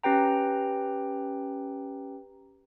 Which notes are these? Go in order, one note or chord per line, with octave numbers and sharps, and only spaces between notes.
C#4 G4 B4 G5 A#5